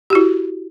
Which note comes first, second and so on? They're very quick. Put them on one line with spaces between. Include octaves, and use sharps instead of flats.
G4 F#4 E4